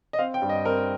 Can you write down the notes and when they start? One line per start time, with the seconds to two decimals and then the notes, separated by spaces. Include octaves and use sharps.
0.13 D#5
0.18 C4 F5
0.34 G5
0.42 G2
0.49 D#5
0.65 C4 A#4